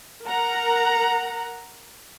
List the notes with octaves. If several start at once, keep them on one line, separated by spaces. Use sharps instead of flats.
A#4 F#5 A#5